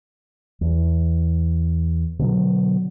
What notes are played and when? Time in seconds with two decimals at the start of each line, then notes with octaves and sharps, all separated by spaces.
0.61 E2
2.19 B2 D3 E3 F#3